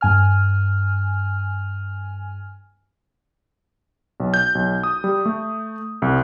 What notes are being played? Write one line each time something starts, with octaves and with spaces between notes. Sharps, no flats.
G2 G#5 F6
B1
G6
B1
D#6
G3
A3
C2